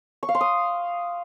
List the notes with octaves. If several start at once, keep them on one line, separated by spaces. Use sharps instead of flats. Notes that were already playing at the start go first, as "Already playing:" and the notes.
C#6
F5
C6
D#6